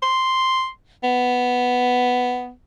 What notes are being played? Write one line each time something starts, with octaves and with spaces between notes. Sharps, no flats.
C6
B3